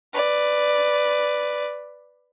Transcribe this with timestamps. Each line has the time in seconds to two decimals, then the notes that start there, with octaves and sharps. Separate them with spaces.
0.13 B4 D5